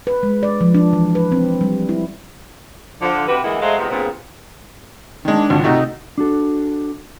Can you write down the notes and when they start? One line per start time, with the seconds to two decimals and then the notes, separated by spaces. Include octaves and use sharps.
0.07 B4
0.23 G#3
0.43 D5
0.61 F3
0.75 D4
0.93 E3
1.15 B4
1.32 C4
1.61 G3
1.89 E4
3.01 D3 F3
3.28 C3 F#4 G4 B4
3.43 D2 E3 G#3 A#3 E4 F#5
3.61 F#3 G#3 A3 C5 D#5 F5
3.78 A2 C3 G#3 B3 F#4 G4
3.90 G2 A#2 C#3 B3 C4 G#4
5.25 D#3 G#3 D4
5.50 G#1 C#2
5.64 C3 A3 D#4 F#4 D#5
6.18 D4 F#4 A4